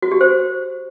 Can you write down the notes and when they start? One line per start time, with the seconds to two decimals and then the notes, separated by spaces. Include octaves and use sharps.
0.02 F#4
0.12 G4
0.21 C5